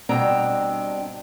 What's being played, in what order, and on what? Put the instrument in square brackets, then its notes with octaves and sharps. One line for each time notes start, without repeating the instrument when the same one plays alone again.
[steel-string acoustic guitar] G2 B2 C4 D4 G5 A#5